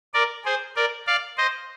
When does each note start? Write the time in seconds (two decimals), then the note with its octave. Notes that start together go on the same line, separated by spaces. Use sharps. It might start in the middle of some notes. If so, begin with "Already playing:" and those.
0.14 A#4 D5
0.45 G#4 C5
0.76 A#4 D5
1.07 D5 F5
1.37 C5 D#5